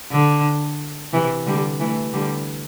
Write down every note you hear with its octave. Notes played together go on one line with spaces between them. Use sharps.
D3
C3 E3
D3 G3
E3 A3
D3 G3